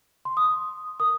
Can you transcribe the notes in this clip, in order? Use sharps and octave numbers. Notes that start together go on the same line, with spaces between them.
C6
D#6
A#4 D#6